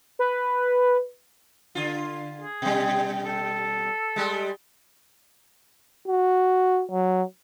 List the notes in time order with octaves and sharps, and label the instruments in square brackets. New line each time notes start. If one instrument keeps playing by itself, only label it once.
[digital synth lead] B4
[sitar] D3 F4
[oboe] G#4
[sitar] B2 G3
[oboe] A4
[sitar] G3 G#3
[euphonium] F#4
F#3